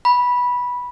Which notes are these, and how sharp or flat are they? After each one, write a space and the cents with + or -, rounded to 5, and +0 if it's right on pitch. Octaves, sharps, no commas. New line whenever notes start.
B5 -10